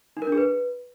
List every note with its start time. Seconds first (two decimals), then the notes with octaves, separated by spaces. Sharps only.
0.17 D#4
0.22 A#4
0.27 D4
0.32 G#4
0.38 B4